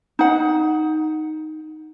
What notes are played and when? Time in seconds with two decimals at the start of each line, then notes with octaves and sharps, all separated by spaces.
0.19 D#4 F#5